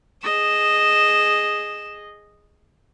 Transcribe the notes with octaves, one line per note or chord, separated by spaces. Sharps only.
G#4 D#5 E7